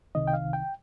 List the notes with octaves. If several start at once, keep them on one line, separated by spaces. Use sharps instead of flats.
C2 C3 D#3 D#5
G5
F5
G5